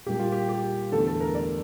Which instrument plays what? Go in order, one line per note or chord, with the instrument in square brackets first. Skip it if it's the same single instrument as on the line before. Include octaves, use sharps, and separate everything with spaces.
[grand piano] A#2 G3 A#3 G4
F4
G4
G4
E2 D3 A3 A4
A4
A#4
D5